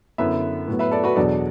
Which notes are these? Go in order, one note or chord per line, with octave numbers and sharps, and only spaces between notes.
F#2 D3 B3 E4 B4 E5
A2 F#3 B3
B4 E5
A4 D5
F#4 B4
E2 B2 F#3 D4 A4 D5